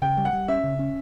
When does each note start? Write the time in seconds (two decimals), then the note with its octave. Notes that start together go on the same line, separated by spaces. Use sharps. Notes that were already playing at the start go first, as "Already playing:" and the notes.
0.02 C#3 G5
0.17 G3
0.25 F#5
0.33 G3
0.48 C#4 E5
0.64 C#3
0.79 C#4